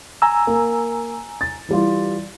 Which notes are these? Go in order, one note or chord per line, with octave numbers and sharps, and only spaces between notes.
G#5 A#5 E6
A#3
A6
E3 G3 F4